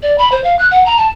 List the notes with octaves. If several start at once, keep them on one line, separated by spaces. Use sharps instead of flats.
D5
B5
C5
F5
F#6
F#5
A#5
A5